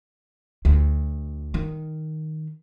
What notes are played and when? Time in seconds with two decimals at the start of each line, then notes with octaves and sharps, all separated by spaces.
0.65 D2
1.54 D#3